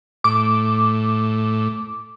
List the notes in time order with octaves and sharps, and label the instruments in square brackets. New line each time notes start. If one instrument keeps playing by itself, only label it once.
[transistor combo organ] A2 [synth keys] D6